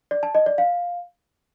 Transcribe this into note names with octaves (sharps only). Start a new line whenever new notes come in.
D5
A5
D#5
D5
F5